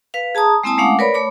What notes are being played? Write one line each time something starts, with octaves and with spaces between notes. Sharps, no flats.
B4 F5
G#4 A5 A#5 D#6
G#3 A#3 C4 E4 A5 D#6
G#3 A3 C#4 F5 F#5 D6
A#4 B4 C#5 D5 B5
A3 C#5 B5 D6